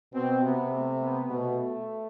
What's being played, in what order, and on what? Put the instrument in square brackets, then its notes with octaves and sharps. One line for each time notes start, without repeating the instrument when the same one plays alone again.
[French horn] B2 [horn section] C4
[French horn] C3 [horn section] B3
[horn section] A3
B3
[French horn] B2 [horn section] A3